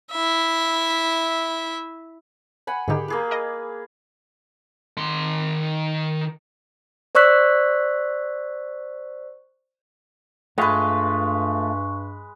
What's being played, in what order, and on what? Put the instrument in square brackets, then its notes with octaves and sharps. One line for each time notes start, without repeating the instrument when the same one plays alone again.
[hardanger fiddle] E4 E5
[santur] F#5 G#5 B5
[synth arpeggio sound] G#2 D3 D#3 [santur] G4 G#4
[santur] A#3 G#4 B4
[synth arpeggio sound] A#4 D#5
[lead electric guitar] D#3 C6
[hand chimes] C5 D5 C#6 E6 F#6 B6
[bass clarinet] G2 [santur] G#3 B4 [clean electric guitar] A3 F4 [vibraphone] C#6